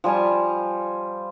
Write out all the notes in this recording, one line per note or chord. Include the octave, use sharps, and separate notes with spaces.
F3 G3 G#5 A5